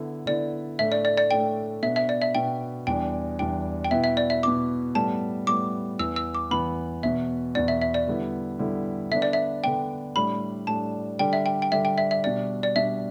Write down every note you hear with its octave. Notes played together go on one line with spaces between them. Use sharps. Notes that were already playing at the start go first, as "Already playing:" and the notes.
Already playing: D3 B3 E4
D3 B3 E4 D5
A2 A3 D4 E5
D5
D5
D5
A2 A3 D4 G5
B2 B3 D4 E5
E5
D5
E5
B2 B3 D4 G5
E2 E3 G3 D4 G5
E2 E3 G3 D4 G5
G5
B2 B3 E4 E5
E5
D5
E5
B2 B3 E4 D6
A2 G3 B3 A5
A2 G3 B3 D6
E2 E3 B3 E6
E6
D6
E2 E3 B3 B5
E2 B2 B3 E5
E2 B2 B3 D5
E5
E5
D5
D3 G3 B3 E4
D3 G3 B3 E4
D3 B3 D4 E5
D5
E5
D3 B3 D4 G5
A2 G3 D4 B5
A2 G3 D4 A5
D3 G3 D4 G5
E5
G5
G5
D3 G3 D4 E5
G5
E5
E5
B2 G3 D4 D5
D5
B2 G3 D4 E5